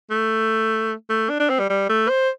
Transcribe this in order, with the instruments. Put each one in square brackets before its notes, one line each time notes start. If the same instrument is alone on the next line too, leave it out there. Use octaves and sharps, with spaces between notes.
[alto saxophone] A3
A3
D4
D4
C4
G3
G3
A3
C5